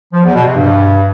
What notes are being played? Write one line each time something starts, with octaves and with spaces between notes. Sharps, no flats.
F3
E2
B2
C3
G2